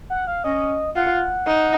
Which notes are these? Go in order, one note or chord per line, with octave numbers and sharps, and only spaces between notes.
F#5
F5
C#4 D#5
F4 F#5
D#4